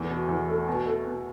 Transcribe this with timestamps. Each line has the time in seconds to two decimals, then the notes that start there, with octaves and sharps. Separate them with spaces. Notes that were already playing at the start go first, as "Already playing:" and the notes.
Already playing: E2 A3
0.10 B2
0.28 E2
0.48 A3
0.68 B2
0.86 A3
1.06 B2